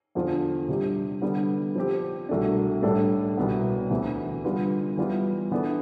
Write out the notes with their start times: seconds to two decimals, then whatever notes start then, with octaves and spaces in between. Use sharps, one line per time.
0.15 E2 D3 F3 C4 F4
0.68 C3 G3 D4 G4
1.22 D3 G3 B3
1.75 F3 C4 G4
2.29 C2 B2 A3 D4
2.83 A2 G3 D4 A4 D5
3.37 C2 B2 B3
3.90 D2 C3 E3 B3
4.44 D3 G3 B3 F4 B4
4.97 E3 G3 B3 F4
5.51 E3 B3 D4 A4